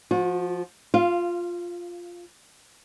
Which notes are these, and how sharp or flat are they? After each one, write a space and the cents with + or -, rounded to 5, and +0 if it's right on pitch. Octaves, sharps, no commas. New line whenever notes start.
F3 +0 F#4 -40
F4 +0 F5 -20